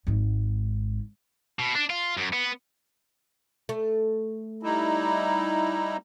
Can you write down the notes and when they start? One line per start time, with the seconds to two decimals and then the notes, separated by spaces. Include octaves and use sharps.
0.07 G#1 G#2
1.59 B2
1.75 D4
1.90 F4
2.17 F#2
2.33 B3
3.69 A3
4.63 G3 D#4 E4